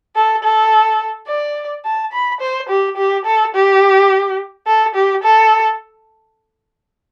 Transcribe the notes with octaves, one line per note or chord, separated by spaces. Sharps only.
A4
A4
D5
A5
B5
C5
G4
G4
A4
G4
A4
G4
A4